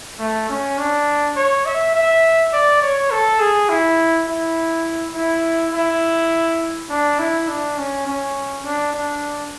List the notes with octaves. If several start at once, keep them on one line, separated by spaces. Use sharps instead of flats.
A3
C#4
D4
C#5
E5
E5
D5
C#5
A4
G#4
E4
E4
E4
E4
D4
E4
D4
C#4
C#4
D4
D4